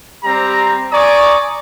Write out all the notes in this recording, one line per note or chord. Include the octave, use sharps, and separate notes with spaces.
G3 C4 G4 A#5
D5 G#5 A#5 C#6 D#6